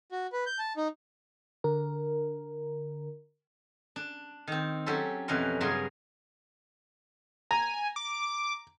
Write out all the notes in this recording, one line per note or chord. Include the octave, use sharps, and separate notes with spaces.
F#4
B4
G6
A5
D#4
D3 A#4
D4
D#3 C4
F#3 C#4 G4 A4 C6
F2 B2 E3 C#4 A#4 C6
G2 C#3 F#3 G#4 A#4 C6
G#5 A#5
D6